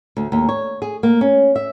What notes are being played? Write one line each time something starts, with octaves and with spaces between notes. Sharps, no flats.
D2
D#2
C#5
G#4
A#3
C#4
E5